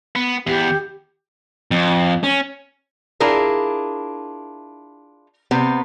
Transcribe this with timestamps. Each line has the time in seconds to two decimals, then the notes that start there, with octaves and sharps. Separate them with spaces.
0.16 B3
0.47 E2 B3 G4
1.71 F2
2.24 C#4
3.20 D4 E4 F4 G#4 A#4
5.51 C3 B3 C4